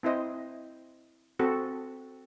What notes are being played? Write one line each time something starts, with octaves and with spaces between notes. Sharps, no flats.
C4 E4 C5 D#5
C4 F#4 A4